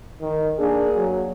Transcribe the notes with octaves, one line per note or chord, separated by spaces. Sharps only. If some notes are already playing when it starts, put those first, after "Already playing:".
D#3
A#3 D4 G#4
F#3